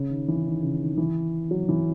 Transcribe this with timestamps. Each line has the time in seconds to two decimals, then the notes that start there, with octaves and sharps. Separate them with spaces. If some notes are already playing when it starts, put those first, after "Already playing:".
Already playing: C#3
0.10 D#3
0.28 E3
0.45 D#3
0.63 C#3
0.81 D#3
0.98 E3
1.51 F#3
1.69 E3